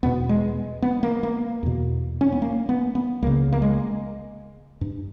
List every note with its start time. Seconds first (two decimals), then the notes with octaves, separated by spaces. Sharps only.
0.03 E2 B2 B3
0.29 G#3
0.82 B3
1.03 A#3
1.23 A#3
1.63 E2 B2
2.21 C#4
2.32 B3
2.42 A#3
2.69 B3
2.95 B3
3.22 C#2 C#3 A#3
3.52 A#3
3.62 G#3
4.81 G2